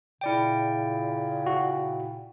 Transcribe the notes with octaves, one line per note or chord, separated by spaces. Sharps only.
A#2 C#3 E4 D5 G5
F#4